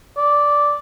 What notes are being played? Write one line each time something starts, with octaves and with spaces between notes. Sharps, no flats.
D5